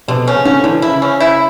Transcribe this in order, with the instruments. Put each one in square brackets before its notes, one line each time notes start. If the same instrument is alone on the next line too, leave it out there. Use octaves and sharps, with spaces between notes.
[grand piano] B2 [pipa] D3
[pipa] C#4
[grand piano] C#3
[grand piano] D3 [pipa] C#4
[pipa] D3 [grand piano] E3
[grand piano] C#3 [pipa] E4
[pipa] C#4
E4